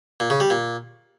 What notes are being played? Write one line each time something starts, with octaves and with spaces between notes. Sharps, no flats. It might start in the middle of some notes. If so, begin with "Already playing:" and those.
A#2
C#3
G3
A#2